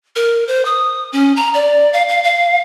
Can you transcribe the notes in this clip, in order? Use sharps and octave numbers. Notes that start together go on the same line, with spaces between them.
A#4
C5
D#6
C#4
A#5
D5
F5
F5
F5